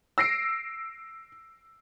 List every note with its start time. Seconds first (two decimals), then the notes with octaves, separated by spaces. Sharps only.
0.18 E6 A#6 C7 D7